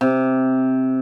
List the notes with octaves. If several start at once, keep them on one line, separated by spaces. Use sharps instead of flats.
C3